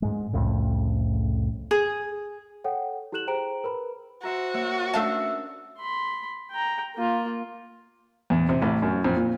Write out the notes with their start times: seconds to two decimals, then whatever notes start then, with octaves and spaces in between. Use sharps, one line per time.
0.02 G#2 G#3
0.33 C2 F2 A2 C#3
1.71 G#4
2.64 A4 C#5 F#5 G5
3.12 E4 G4 A4 F#6 E7 F#7
3.27 G#4 C5 G5 A#5 D7
3.64 A#4 B4 B5
4.23 F#4 C5 E5 A#5
4.54 A#3 C#5 E5
4.94 A3 C#4 D4 E5 F5 A5 E6
5.78 B5 C6
6.51 G5 A#5
6.96 A#3 F4
8.30 E2
8.49 C3
8.62 A1
8.82 F#2
9.04 F2
9.16 A#2